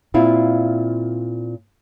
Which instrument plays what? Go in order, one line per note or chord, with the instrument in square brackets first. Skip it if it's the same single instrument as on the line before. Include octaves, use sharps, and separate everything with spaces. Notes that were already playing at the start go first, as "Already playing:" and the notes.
[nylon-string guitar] A#2 C4 E4 F4